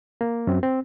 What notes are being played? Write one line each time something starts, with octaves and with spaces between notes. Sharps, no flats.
A#3
F#2 C4
C4